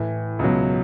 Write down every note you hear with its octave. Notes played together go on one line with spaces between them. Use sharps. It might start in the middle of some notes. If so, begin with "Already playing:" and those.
Already playing: A2 E3
C#2 B2 F#3